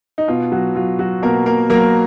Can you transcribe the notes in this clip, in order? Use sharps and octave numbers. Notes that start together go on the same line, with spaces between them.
D#4
B2 F4
F#3 F#4
F#3 F4
F#3 F#4
B2 A#3 A#4
A#3 A#4
F#3 A#3 A#4